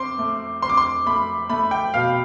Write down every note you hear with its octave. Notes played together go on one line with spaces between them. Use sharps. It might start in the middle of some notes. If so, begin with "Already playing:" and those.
Already playing: C4 C6 D6
A3
C4 C6
D6
C6
A3 B5
A3 B5
G5
B2 F5